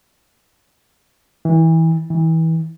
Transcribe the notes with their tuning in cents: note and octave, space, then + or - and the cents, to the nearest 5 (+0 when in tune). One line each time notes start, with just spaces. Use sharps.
E3 -25
E3 -30